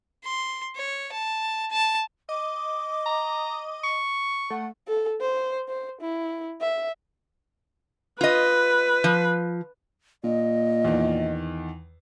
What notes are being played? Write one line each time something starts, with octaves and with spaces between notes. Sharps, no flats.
C6
C#5
A5
A5
D#5 D6
A#5
C#6
A3 F#5
A4
C5
C5
E4
E5
F4 B4 D#5
F3
A#2 D#5
E2 D#3